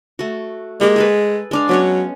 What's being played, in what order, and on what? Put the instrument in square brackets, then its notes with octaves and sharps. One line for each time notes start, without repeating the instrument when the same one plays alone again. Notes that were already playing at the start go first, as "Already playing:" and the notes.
[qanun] A3 F#4
[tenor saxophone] G#3 [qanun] A#3 G4
[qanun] G#4 A4 B4
G#3 D4 F5
[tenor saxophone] F#3 [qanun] B3 C#4 C#5